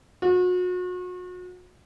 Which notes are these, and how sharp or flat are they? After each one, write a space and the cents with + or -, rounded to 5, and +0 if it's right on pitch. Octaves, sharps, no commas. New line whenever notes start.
F#4 -35